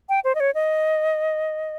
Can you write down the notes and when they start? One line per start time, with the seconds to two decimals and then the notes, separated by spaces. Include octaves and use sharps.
0.09 G5
0.24 C5
0.35 D#5
0.40 C#5
0.55 D#5